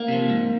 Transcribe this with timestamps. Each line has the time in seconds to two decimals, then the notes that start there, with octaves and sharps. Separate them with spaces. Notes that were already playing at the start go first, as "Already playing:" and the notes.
Already playing: A#3
0.08 C3 F3
0.30 G#2